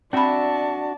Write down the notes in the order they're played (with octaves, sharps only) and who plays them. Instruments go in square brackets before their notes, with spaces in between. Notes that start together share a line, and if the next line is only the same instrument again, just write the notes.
[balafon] C4 B5 [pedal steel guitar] D4 F#4 E5 [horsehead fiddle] D5 A5